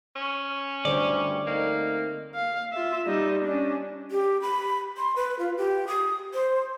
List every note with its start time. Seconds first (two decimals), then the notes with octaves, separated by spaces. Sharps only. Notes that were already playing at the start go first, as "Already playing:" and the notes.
0.16 C#4
0.85 D2 G2 D3 G3 C5 D5
1.46 A3 A#3 C4 D#4
2.35 F5
2.72 F4 E5
3.06 G3 D#4
3.44 C#4 D4
4.11 G4
4.42 B5
4.97 C6
5.16 B4
5.39 F4
5.57 G4
5.87 D#6
6.34 C5